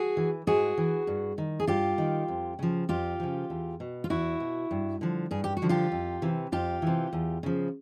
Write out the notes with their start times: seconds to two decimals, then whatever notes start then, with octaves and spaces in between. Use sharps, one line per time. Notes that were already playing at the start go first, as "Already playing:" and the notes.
Already playing: F#4 G#4
0.17 E3
0.47 G#2 F#4 G#4
0.78 E3
1.07 G2
1.38 D#3
1.60 G#4
1.67 G2 F4 G4
1.98 D#3
2.28 F2
2.59 C#3 F3
2.89 F2 F4 G4
3.20 C#3 F3
3.50 E2
3.80 B2
4.04 F4
4.10 E2 E4 F#4
4.40 B2
4.71 G2
5.01 D3 F3
5.31 G2 G#4
5.44 G4
5.57 F#4
5.62 D3 F3
5.69 F4 G4
5.92 F2
6.22 C3 E3
6.52 F2 F4 G4
6.82 C3 E3
7.13 E2
7.43 C#3 F3